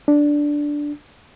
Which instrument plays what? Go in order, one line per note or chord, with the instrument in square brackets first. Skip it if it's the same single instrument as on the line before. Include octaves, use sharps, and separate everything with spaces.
[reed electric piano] D4